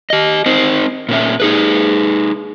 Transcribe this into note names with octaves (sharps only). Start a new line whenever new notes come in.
G4 D#5
C4 D#4 C5
A#2 C#4 E5
D#4 G#4 B4